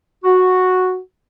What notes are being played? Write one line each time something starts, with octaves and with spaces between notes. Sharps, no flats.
F#4